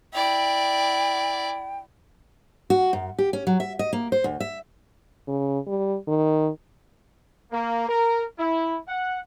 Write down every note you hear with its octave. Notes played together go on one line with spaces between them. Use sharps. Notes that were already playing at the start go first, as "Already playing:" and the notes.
E4 D5 G5
F#4
F#2
G4
C#4
F#3
E5
D#5
A#3
C5
D2
E5
C#3
G3
D#3
A#3
A#4
E4
F#5